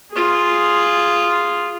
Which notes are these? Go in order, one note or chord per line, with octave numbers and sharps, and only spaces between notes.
F4 G#4